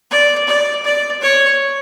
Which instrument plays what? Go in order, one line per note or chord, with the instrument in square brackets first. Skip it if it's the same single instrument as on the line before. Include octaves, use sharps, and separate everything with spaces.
[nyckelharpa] D5
D5
D5
C#5